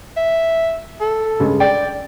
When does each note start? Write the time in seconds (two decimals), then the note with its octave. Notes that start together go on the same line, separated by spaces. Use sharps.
0.16 E5
1.00 A4
1.40 G2 C#3 G#3
1.60 D5 G5